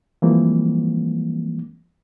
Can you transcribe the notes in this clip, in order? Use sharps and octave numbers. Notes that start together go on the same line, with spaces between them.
E3 F3 G3 G#3 A#3 C4